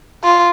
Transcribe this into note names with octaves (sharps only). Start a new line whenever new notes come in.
F4